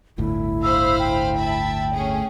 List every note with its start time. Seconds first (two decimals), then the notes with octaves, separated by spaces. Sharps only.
0.18 G1 D2 A2 E4
0.62 C5 F5 B5 E6
0.98 G5
1.38 E5 A5 B5
1.94 A3 C#4 G#4